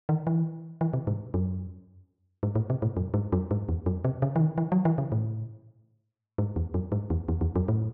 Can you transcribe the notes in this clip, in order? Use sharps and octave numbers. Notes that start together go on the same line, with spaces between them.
D#3
E3
E3
C3
G#2
F#2
G#2
A2
C3
A2
F#2
G#2
F#2
G#2
E2
F#2
C3
C#3
E3
D#3
E3
F#3
E3
C#3
A2
G#2
E2
F#2
G#2
E2
E2
E2
F#2
A2